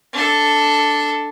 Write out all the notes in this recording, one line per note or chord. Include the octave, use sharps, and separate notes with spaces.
D4 A4